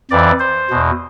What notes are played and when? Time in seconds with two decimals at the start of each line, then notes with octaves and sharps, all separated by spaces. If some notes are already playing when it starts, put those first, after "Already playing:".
0.11 F2 E3 D5
0.40 C5
0.70 E2 B2